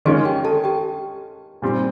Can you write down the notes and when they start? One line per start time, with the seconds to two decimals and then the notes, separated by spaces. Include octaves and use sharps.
0.05 D#3 G#3 C#4 F4 G#4 G#5
0.25 G4 G5
0.45 A4 A5
0.64 G4 G5
1.62 A#2 G3 C4